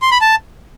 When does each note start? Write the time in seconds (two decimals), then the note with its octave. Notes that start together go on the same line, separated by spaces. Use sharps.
0.02 C6
0.11 B5
0.21 A5